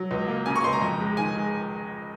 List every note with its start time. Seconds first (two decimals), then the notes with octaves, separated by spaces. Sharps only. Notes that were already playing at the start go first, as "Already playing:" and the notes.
Already playing: F#3
0.11 C#2
0.28 A#3
0.46 C#3 G#5
0.56 C#6
0.64 C#2 C6
0.73 A#5
0.81 F2
1.00 G#3
1.17 D#3 G#5
1.35 G#3